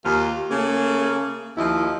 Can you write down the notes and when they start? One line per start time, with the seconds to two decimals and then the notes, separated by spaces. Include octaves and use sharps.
0.05 D#2 F4
0.50 C#3 A3 A#3 G#4
1.58 D#2 F3 E4 D#5